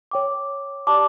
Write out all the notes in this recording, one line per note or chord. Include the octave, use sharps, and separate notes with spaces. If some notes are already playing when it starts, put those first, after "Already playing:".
C#5 G5 D6
G4 D5 A5 D6